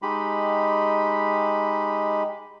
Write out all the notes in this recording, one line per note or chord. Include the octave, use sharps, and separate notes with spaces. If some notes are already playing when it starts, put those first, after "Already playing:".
G#3 D#4 G4 B5